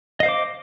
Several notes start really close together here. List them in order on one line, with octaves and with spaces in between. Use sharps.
D#5 F5 C5 D6